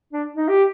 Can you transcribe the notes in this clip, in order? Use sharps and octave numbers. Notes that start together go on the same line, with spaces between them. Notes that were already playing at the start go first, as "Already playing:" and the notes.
D4
D#4
G4